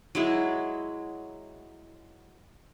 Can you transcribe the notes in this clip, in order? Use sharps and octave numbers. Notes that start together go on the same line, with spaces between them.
F#3 G#3 E4